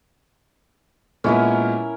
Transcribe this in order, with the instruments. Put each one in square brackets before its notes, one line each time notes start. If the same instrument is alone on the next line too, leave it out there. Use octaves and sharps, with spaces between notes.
[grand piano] A#2 G#3 B3 [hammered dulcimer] C#4 E4 A#4